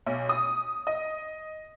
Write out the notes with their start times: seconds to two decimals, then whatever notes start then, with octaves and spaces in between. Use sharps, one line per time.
0.06 B1
0.29 D#6
0.87 D#5